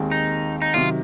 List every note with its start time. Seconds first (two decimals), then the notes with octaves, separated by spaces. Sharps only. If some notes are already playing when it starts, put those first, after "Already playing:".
Already playing: D#2 D#3 G#3 C4
0.11 D#4
0.62 D#4
0.74 C3 D#3 F#3 F4